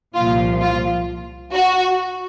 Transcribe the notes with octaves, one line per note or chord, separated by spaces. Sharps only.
C2 A#2 F3 F4
F4
F#4